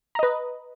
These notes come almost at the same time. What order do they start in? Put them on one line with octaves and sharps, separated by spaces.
A#5 D#5 B4